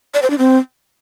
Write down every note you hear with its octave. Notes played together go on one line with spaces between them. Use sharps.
D5
C5
D4
C4